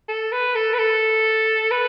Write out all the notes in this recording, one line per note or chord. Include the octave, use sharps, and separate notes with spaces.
A4
B4
A4
B4
A4
B4